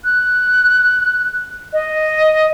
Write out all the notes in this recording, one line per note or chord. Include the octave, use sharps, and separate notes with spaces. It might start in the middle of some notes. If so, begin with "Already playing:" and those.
F#6
D#5